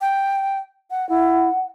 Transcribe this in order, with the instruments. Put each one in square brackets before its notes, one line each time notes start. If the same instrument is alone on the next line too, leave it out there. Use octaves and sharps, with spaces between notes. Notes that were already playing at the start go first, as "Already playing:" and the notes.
[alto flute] G5
F#5
[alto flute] E4 [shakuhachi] F#5